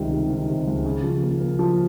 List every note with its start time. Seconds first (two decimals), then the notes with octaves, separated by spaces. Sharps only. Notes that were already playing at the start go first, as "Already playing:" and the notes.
Already playing: C#2 C3 D#3 G3
0.11 C3
0.30 D#3
0.49 C3
0.67 C#2
0.85 C#3
1.03 F3
1.23 A#3
1.40 A#3
1.59 F3